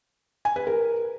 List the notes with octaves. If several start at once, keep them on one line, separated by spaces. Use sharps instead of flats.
G#5
B4
A#4